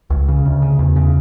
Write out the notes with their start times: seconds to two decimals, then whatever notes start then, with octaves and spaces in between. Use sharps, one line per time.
0.10 C#2
0.28 C#3
0.46 D2
0.62 C#3
0.79 E2
0.96 C#3